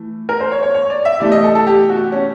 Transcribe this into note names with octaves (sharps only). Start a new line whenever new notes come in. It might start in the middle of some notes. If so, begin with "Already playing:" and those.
Already playing: E3 A3
A#4
C5
C#5
C#5
C#5
D5
E5
C3 E3 A3 D5
D#5
A4
A4
G4
F#4
C#4